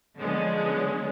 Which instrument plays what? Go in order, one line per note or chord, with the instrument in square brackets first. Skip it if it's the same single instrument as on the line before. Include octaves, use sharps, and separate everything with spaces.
[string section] D3 F3 F#3 G#3 B3 C#4